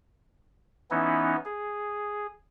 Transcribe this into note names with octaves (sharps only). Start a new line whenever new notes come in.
E3 B3 C#4 D#4 E4
G#4